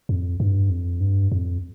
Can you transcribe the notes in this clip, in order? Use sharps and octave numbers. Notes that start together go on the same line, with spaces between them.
F2
G2
F2
G2
F2